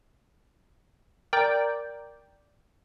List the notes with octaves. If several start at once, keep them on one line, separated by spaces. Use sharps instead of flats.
A#4 D5 G5